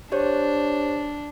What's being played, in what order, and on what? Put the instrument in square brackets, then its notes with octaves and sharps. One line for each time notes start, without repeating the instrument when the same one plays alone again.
[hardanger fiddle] D4 [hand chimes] G4 C5 C#5